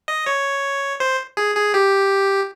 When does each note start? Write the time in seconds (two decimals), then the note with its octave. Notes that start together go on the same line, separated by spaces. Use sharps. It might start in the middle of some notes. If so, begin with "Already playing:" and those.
0.08 D#5
0.26 C#5
1.00 C5
1.37 G#4
1.56 G#4
1.74 G4